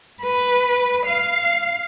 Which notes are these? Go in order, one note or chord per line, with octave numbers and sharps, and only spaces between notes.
B4
F5